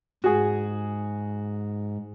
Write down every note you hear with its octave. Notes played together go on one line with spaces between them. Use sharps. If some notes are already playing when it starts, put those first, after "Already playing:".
G#2 F#4 G#4